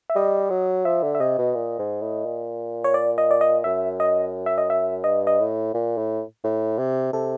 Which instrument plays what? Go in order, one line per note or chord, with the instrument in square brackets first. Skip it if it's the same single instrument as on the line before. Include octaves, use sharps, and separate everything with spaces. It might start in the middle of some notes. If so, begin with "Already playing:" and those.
[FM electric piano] E5
[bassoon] G3 [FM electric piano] D#5
[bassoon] F#3
[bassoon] F3 [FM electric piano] E5
[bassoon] D3
[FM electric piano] E5
[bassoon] C3 [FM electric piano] D#5
[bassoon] B2
A#2
G#2
A2
A#2
[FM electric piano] C#5
D5
D#5
D5
D#5
[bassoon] F#2 [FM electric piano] E5
[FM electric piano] D#5
E5
D#5
E5
[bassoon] G2 [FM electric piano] D#5
[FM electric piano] D#5
[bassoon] A2
A#2
A2
A2
C3
[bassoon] C3 [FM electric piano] A4